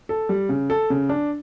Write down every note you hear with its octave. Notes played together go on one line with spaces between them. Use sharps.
A4
G3
C#3
A4
C#3
D4